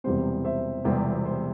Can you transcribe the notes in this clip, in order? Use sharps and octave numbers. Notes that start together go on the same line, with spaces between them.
E1 E2 C3 G3 C4 C5
C5 E5
E1 E2 C3 G3 C4 C5
C5